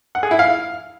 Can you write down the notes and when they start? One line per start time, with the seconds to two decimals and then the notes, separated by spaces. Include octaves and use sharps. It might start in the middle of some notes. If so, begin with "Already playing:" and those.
0.15 F#5
0.23 G#4
0.31 E4
0.39 F5